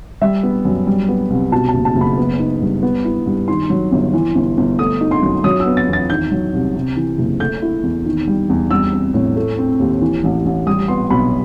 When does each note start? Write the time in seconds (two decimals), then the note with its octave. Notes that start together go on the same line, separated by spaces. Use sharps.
0.22 G3 E5
0.43 B3
0.65 F#2
0.87 G3
1.08 B3
1.30 C2
1.52 B2 A5
1.69 A5
1.74 F#1
1.85 A5
1.95 F#1
2.01 B5
2.18 B3
2.39 D#4
2.61 G2
2.83 B3
3.05 E4
3.26 G2
3.48 D#3 C6
3.70 F#3
3.92 G1
4.14 E3
4.35 G1
4.57 G1
4.79 A3 D#6
5.01 D#4
5.11 C6
5.23 F#2
5.44 F#3 D#6
5.60 E6
5.66 B3
5.77 A6
5.88 E2
5.93 A6
6.10 D#3 G6
6.32 F#3
6.53 C2
6.75 C3
6.96 E3
7.18 F#1
7.40 A3 G6
7.62 E4
7.83 E2
8.06 D#3
8.27 G3
8.49 E2
8.71 G3 E6
8.93 C4
9.14 A2
9.36 A3
9.58 C4
9.79 D#2
10.02 E3
10.24 A1
10.45 A1
10.67 G3 D#6
10.88 B3 C6
11.10 B1 B5